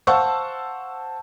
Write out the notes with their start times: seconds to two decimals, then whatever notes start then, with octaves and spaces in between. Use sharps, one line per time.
0.07 C5 F5 F#5 A5 C#6 E6